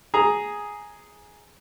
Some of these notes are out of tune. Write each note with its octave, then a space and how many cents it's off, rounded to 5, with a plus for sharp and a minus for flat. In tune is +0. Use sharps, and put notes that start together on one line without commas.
G#4 +0 A#5 +0